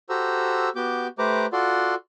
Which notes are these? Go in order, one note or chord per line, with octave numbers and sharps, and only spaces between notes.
F#4 G4 A4 C5 A#5 E6
B3 F#4 G4 D6 G6
A3 G4 B4 C5 A#5 D6
F4 F#4 A4 D5 F#5 C6